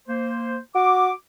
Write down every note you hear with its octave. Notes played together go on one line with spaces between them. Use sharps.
A#3 C5
F#4 D6